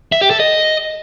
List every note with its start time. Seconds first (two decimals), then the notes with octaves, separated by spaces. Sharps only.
0.12 E5
0.21 G4
0.31 A4
0.40 D#5